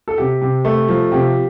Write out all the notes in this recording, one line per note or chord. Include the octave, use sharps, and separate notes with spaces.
A4
C3 G4
C3
A3
F3
C3 G4